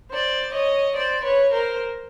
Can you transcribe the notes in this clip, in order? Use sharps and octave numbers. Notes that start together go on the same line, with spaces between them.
C5 D5
C#5 D#5
C5 D5
B4 C#5
A#4 C5